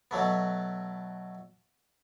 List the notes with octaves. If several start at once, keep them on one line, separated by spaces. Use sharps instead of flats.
B2 F#3 A3 B3